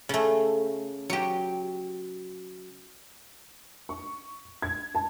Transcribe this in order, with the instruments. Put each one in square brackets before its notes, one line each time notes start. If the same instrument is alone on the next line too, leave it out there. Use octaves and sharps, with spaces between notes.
[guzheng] C#3 A3
F#3 G4
[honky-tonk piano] C#6
G#6
A5